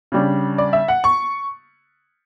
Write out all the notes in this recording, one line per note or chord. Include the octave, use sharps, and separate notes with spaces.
C#3 G3 D4
D5
E5
F#5
C#6